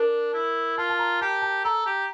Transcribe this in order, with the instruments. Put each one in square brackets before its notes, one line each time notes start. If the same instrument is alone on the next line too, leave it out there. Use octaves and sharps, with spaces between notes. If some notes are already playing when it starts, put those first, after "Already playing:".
Already playing: [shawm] D4 [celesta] A#4
[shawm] E4
[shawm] F4 [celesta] A5
[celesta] A5
A#5
[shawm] G4 [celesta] A5
[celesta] A5
[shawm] A4 [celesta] A#5
[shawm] G4